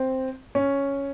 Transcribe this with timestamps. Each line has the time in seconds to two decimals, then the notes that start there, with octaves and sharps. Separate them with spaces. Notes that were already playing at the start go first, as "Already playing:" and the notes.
Already playing: C4
0.55 C#4